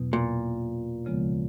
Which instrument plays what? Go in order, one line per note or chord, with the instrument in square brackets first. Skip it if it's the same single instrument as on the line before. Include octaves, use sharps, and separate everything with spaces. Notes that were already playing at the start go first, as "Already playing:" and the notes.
Already playing: [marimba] E2 B2 F#3 B3 E4
[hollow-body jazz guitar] A#2
[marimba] D2 C#3 F3 G#3 B3